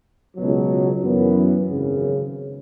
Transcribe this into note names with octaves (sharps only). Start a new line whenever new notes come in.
C#2 B2 F#3
F#2 E3 B3
G#1 F#2 C#3